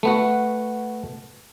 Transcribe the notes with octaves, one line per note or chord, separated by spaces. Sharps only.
A3 B3 F#4